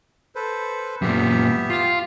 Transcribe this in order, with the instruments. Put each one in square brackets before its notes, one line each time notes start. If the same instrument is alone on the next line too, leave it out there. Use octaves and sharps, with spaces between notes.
[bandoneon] A4 B4 C5
[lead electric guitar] F#2 A#2 [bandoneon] B3 G4 E5
[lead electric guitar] F4